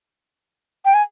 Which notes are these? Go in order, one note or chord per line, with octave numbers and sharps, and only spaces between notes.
G5
G#5